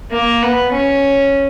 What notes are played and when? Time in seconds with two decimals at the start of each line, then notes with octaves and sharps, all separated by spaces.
0.11 A#3
0.42 B3
0.72 C#4